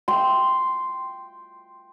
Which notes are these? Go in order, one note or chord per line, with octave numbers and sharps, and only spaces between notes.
G5 C6